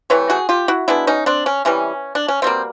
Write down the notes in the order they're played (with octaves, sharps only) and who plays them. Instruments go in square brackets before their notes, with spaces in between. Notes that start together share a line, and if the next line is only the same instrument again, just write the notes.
[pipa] C3 E3 A3 B4 C#5
F#4 G#4
F4 G4
E4 F#4
B2 G#3 B3 D4 E4
C#4 D#4
C4 D4
C#4
C3 E3 G3 C#4
D4
C#4
B2 G3 A#3 C4